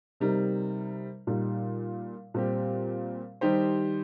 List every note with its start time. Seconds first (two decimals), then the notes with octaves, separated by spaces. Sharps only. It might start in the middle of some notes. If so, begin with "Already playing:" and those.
0.20 C3 G3 D#4 A#4
1.27 A#2 G3 D#4
2.34 A#2 G3 C4 G4
3.41 D#3 G3 D#4 G4 C5